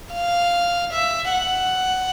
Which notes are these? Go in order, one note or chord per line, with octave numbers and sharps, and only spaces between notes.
F5
E5
F#5